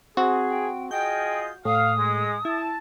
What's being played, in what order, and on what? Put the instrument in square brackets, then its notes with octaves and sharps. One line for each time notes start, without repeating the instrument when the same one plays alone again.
[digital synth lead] C4 [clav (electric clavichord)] F#4 [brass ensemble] G#4
[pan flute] G5
[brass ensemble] F4 G#4 D#5 [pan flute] G5 [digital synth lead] G6
[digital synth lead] A2 [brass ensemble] F5 [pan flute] D#6
[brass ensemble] G#3
[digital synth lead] E4 [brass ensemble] A5